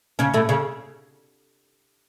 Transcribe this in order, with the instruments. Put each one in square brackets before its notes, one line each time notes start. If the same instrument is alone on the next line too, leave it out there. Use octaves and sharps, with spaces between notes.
[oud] C#3 C#4
A2 A3
C#3